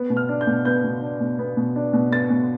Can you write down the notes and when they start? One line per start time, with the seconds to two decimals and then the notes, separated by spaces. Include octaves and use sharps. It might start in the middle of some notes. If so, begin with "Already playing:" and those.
Already playing: B3
0.10 B2
0.17 F6
0.29 D4
0.41 G6
0.47 B2
0.65 B3 G6
0.84 B2
1.01 D4
1.21 B2
1.39 B3
1.57 B2
1.76 D4
1.93 B2
2.11 B3 A6
2.30 B2